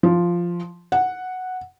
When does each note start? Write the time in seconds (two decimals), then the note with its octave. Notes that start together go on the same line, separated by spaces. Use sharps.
0.03 F3
0.92 F#5